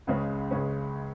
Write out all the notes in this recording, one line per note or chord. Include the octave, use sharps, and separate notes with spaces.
C#2 C#3 G#3 C#4
C#2 C#3 G#3 C#4